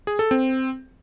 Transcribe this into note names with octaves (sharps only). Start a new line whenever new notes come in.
G#4
A4
C4